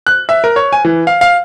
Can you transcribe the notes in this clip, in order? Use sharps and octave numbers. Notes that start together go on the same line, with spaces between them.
F#6
E5
A#4
C#5
G#5
E3
F5
F5